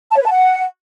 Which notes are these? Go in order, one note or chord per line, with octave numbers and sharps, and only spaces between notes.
A5
C#5
B4
A5
F#5